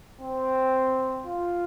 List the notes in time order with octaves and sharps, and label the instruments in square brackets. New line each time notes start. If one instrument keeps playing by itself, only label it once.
[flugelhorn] C4
F4